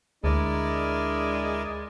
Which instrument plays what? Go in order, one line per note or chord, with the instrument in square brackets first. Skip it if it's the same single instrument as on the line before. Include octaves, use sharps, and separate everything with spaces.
[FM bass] D2 [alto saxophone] G#3 [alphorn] D4 [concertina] E4 A#4 D5